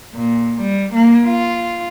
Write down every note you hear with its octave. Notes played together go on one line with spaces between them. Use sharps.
A#2
G3
A#3
F4